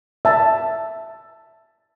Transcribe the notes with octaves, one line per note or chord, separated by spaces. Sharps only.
E5 A5